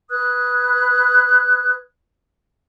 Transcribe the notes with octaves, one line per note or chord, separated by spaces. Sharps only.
B4 D#6 F#6 G#6